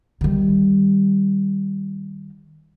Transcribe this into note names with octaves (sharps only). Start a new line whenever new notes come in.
D#3 G3